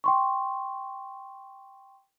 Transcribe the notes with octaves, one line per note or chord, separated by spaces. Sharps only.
G5 C6 C#6